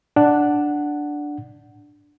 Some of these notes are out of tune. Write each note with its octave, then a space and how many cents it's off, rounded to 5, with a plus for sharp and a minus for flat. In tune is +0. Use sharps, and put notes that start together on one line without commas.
D4 +0 F#5 +0